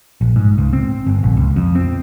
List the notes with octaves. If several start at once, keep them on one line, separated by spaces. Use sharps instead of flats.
A#1
G#2
C#2
C4
G1
A#1
C#2
F2
C4